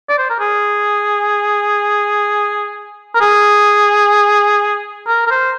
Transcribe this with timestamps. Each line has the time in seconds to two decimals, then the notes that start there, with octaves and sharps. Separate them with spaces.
0.09 D5
0.18 C5
0.30 A#4
0.40 G#4
3.15 A#4
3.21 G#4
5.07 A#4
5.27 A#4
5.31 C5